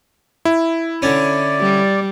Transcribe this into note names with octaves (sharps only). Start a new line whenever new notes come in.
E4
D3 C#4 D5
G3